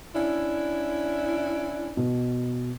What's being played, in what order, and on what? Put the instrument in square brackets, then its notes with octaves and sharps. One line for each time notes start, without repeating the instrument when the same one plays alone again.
[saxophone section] C#4 D4 E4
[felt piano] B2